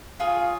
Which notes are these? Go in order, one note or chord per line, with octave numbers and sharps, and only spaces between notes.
F4 G#4 C#5 F5